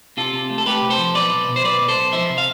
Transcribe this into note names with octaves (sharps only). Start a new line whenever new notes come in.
C3 F4 A4
C3
A3
A4
A3 G4 B4
C3
A4 C5
F3
B1 B4 D5
B1
B2
C5
B1 B4 D5
B2
A4 C5
B1
F3 C5 E5
C3
F5